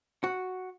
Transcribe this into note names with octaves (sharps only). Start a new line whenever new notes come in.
F#4